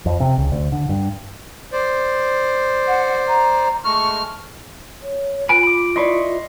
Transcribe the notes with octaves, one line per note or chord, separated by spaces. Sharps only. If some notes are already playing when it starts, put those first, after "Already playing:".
F2
C3
C#2
D2
D3
G2
C5 D5
F#5
A#5
G#3 A3 C#6 F6
C#5
F4 B4 G#5 B5 D7
B5 D6
E4 B4 D5 D#5 C6 C#6